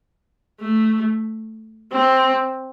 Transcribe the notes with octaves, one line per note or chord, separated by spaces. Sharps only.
A3
C4